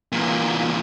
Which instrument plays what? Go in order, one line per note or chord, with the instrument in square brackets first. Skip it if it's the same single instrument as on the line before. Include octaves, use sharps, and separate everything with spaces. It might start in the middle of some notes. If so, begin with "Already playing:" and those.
[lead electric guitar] E2 A#2